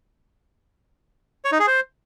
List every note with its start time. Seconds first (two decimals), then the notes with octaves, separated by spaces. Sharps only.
1.45 C#5
1.52 D#4
1.60 G#4
1.67 C5